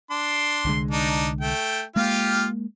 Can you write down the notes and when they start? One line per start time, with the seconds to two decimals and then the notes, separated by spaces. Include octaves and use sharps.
0.10 D4 C6
0.65 C2 D3 G#3
0.91 D4 D#4
1.41 A3 G5
1.96 G#3 A#3 F4 G4 F5